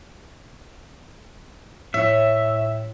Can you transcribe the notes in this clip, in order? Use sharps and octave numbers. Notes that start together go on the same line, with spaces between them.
A2 C#5 E5